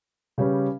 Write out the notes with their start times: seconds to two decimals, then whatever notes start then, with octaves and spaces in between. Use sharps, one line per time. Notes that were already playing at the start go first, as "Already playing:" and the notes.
0.38 C#3 G3 C#4 G4 B4